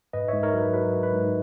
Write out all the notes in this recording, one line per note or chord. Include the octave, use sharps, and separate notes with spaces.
G#2 B4 D#5
G#2 C#5 E5
A#4 C#5
F#3 B4
F#3 B4
F#3
B4
G#2